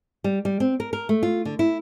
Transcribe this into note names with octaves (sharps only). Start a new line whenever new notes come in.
G3
G3
C4
A#4
A#4
A3
F4
D3
E4